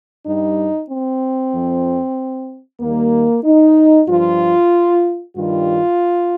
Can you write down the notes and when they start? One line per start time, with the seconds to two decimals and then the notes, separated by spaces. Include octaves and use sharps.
0.25 G2 G3 D#4
0.89 C4
1.53 F2 F3
2.80 D#2 D#3 G3 A#3
3.44 D#4
4.08 G2 F3 F4
5.36 G2 D#3 G3 F4